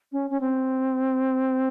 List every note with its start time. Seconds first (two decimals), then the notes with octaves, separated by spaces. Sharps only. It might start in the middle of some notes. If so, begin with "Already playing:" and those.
0.12 C#4
0.30 C#4
0.41 C4